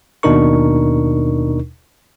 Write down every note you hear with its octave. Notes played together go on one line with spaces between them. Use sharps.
D#2 B2 D4 D#4 A#4 C#6